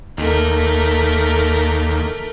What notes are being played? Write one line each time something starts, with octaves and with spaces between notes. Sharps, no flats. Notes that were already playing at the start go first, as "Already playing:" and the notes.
D#2 A3 A#4